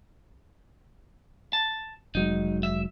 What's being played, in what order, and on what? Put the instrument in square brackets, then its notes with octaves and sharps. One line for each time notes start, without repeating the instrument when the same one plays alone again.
[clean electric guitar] A5
[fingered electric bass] F1 F#3 G#3 [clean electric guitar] D#4
[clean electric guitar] E5